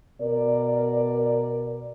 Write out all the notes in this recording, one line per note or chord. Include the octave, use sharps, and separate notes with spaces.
B2 A#4 D5